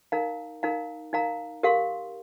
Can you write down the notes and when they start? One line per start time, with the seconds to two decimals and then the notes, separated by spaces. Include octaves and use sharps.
0.12 D#4 A#4 F5 A#5
0.63 D#4 A#4 F5 A#5
1.13 D#4 A#4 F5 A#5
1.63 G4 A#4 F5 C6